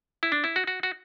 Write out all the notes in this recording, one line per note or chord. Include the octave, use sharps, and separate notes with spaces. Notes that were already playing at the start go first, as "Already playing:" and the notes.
E4
D4
E4
F#4
F#4
F#4